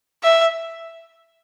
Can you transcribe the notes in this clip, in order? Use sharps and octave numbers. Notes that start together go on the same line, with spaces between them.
E5